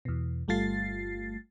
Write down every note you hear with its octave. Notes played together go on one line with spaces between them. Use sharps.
E2 B2
G1 G3 A3 F4 A6 C7